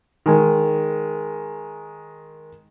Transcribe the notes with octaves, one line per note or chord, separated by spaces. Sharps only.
D#3 G#3